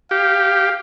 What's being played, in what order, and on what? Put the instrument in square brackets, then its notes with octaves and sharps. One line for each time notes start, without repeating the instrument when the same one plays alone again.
[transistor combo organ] G4 [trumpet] F5